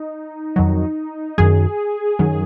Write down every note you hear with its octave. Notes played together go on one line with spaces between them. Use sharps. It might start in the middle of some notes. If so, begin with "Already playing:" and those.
Already playing: D#4
F2 D#3 F#3
F#2 D#3 F#3 G#4
F#2 D#3 F#3